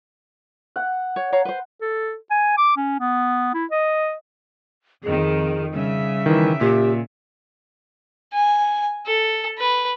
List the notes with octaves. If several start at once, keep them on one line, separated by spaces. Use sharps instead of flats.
F#5
C#5
C#5 F5 A#5
B4 C5
A4
G#5
D6
C#4
B3
E4
D#5
F2 D#3 G#4
C#3 G3 E5
D#3 E3
A#2 G4
G#5
A4
B4